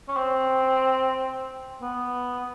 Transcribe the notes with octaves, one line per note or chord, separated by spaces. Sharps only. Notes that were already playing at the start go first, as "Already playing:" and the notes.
C#4
C4
B3